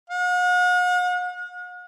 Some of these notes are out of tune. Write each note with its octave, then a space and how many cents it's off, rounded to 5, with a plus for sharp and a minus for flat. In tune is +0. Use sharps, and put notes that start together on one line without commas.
F#5 -45